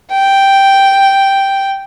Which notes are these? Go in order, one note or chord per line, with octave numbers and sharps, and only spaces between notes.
G5